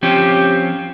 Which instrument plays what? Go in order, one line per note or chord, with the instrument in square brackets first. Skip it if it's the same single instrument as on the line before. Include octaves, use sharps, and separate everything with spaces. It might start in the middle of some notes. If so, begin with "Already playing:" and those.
[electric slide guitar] F3 C4 C#4 [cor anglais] G4